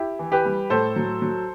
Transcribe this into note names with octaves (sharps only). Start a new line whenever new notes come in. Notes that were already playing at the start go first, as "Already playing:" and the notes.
Already playing: E4 G4
E3
G4 B4
G3
A2 A4 C5
F#3
F#3